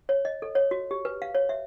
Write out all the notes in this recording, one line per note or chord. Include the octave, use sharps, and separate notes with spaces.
C#5
D#5
A4
C#5
F#4
G4
B4
F5
C#5
E5